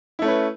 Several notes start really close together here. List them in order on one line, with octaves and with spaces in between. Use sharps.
E4 A3 C#4 B4